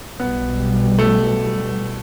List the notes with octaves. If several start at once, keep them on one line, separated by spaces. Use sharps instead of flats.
B1 B2 G3 B3
A3